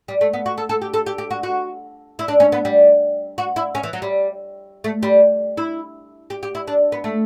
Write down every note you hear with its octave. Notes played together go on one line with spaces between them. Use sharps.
G3
A3
B3
F#4
A4
A4
G4
A4
G4
G4
F#4
F#4
E4
D4
C#4
B3
G3
F#4
E4
C#4
E3
F#3
G3
A3
G3
E4
G4
G4
E4
D4
B3
A3